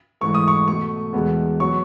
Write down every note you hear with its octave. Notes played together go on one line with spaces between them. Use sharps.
G#2 E3 A3 C#6
D#6
C#6
B2 A3 C#6
E2 B2 G#3 B3
F#3 B3 C#6